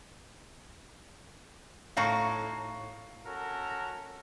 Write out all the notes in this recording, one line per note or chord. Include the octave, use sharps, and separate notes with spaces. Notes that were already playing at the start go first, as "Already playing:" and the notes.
A2 D#4 F#4 F5 A#5 C#6
C#4 F#4 A4 A#4